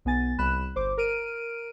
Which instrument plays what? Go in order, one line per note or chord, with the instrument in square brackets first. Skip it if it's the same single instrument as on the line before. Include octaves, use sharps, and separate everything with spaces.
[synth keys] B1 B3 G#5 A6
C2 B5 F#6 E7
G1 C5 D6
A#4 F6 D7 D#7